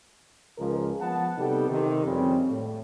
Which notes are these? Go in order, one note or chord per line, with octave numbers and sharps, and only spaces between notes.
C#2 G#2 F3 G#4 A#4
F3 B3 F#5 A5
C3 G3 B3 D#4 G4 A4
C3 D#3
F2 C#3 G3 C4
A2